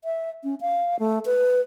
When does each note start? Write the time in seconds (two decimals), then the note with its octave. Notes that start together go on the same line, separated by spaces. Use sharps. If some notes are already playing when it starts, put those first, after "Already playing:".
0.04 E5
0.44 C#4
0.61 F5
0.99 A3
1.26 B4